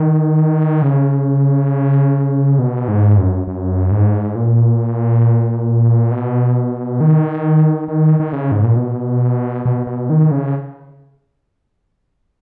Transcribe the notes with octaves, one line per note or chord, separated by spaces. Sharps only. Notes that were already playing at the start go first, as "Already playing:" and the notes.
Already playing: D#3
C#3
B2
G#2
F#2
F#2
G#2
A#2
B2
D#3
D#3
D#3
C#3
G#2
A#2
B2
B2
B2
D#3
C#3